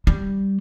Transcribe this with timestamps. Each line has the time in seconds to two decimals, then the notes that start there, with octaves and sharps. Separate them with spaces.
0.07 G3